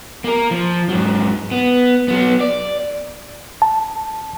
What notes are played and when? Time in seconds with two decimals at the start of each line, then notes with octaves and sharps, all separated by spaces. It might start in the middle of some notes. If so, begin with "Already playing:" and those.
0.24 A#3 A#4
0.51 F3
0.89 G#2 F#3
1.52 B3
2.08 F#3 B3
2.40 D5
3.62 A5